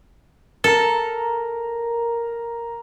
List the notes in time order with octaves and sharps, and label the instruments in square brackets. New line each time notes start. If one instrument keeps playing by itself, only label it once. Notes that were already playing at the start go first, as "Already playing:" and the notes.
[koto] A4 [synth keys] A#4 A#5